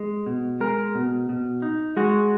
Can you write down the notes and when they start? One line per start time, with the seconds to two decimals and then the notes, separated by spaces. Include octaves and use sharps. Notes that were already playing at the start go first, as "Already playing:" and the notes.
Already playing: G#3
0.26 B2
0.60 G#3 A#4
0.95 B2
1.29 B2
1.62 D#4
1.97 G#3 F#4